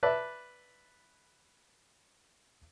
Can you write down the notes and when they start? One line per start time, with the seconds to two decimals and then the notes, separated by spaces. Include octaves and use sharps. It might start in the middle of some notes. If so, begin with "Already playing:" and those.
0.03 B4 D5 E5 A5